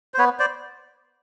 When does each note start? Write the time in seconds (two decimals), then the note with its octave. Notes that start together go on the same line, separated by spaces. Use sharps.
0.14 C5
0.18 B3 B4 C#5
0.39 C5 D5